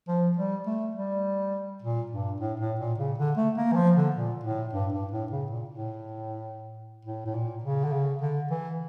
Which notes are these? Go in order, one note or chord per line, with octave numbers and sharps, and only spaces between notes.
F3
G3
A3
G3
A#2
G2
A2
A2
A#2
C#3
D3
A3
A#3
E3
F3
D3
A#2
A2
G2
G2
A2
C#3
A#2
A2
A2
A2
A#2
C#3
D3
C#3
D3
E3